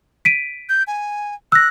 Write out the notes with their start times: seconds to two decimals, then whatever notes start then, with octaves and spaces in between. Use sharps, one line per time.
0.25 B6 D7 D#7
0.69 G6
0.87 G#5
1.52 E6 F#6 A#6